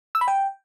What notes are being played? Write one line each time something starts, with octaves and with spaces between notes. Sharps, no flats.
E6
B5
G5